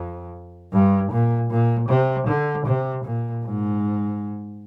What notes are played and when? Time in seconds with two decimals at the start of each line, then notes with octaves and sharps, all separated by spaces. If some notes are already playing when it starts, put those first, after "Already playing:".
Already playing: F2
0.73 G2
1.12 A#2
1.50 A#2
1.89 C3
2.28 D3
2.67 C3
3.05 A#2
3.44 G#2